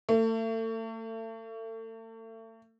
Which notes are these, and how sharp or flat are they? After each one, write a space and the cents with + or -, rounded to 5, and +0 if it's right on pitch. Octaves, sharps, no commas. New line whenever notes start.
A3 +35